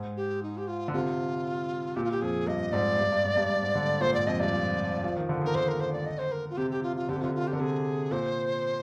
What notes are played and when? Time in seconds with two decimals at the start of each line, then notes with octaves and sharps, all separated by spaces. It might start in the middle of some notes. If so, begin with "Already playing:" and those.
Already playing: G#2
0.17 G4
0.43 D#4
0.57 G4
0.68 F4
0.88 D3
0.93 C3 F4
1.96 A#2 G4
2.04 F4
2.11 G4
2.22 F2 G#4
2.47 G2 D#5
2.72 G#2 D5
2.99 G2
3.12 G2
3.25 G#2
3.37 G2
3.50 G2
3.62 G#2
3.75 D3
4.01 A#2 C5
4.14 G#2 D5
4.27 F2 D#5
4.40 G2 D5
4.53 F3
5.04 F3
5.16 D#3
5.29 D3
5.42 D#3 A#4
5.55 D3 C5
5.68 A#4
5.80 C5
5.93 D5
6.06 D#5
6.18 C5
6.32 A#4
6.50 F4
6.57 C3 G4
6.71 G4
6.83 F4
6.96 F4
7.09 D3 G4
7.16 C3
7.21 D3 F4
7.35 F4
7.47 G4
7.53 D3 A#4
7.60 C3 G#4
8.11 A#2 C5